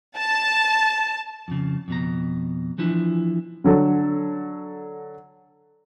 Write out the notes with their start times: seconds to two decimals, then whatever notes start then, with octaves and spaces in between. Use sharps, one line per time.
0.17 A5
1.48 F2 C#3
1.88 F2 B2 A#5
2.78 E3 F3 D4 E4
3.64 D3 F#3 A4